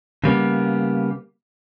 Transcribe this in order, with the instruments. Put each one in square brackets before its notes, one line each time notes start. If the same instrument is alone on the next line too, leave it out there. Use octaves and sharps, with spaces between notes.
[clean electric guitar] C#3 G3 A#3 B3